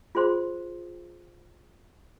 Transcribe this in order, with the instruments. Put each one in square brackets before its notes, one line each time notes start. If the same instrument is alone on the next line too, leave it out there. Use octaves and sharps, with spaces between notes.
[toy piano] F4 G#4 C5 C6